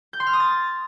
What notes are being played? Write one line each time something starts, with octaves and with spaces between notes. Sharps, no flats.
G6
C6
F6
D#6
A6